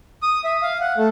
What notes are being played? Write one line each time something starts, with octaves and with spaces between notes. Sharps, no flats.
D#6
E5
F5
F#5
A3